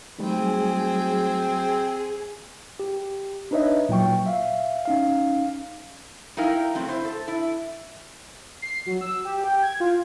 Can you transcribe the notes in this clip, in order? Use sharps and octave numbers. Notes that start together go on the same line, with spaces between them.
F#3 G3 A3 C4 D#4 G#4 G#5
G4
D4 D#4 B4 C#5 D#5 E5
A#2 F#3 G5 C#6
E5 F5
C#4 D#4 F5
D#4 E4 A#4 F5 G5
F#3 A3 C4
E4 C5
A4
E4
C7
F#3
E6
G4
G5
G#6
F4